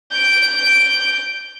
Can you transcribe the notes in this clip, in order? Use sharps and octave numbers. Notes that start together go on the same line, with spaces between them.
G6 D7